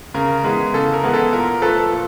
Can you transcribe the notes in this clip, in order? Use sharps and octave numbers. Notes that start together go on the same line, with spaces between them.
C#3 A#4
E3 G#3 B3
C#3 A4
A#4
E3 G#3 B3
A4
A#2 A#4
F3 A3 A4 B4
A#2